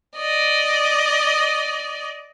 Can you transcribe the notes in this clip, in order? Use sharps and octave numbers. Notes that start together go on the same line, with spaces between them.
D5 D#5